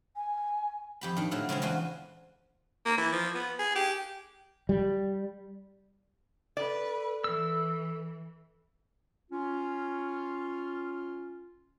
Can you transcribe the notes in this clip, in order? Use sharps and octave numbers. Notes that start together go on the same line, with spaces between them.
G#5
F2 G4 B5
D#3 D4
A#2 F#3 A3 E4 F5
C#3 G#3 C4 C#4
E2 D4 F4 F#4 G#5 C6
A#3
E3
F3
B3
G#4
G4
G3
A4 B4 D5
E3 E6
C#4 F4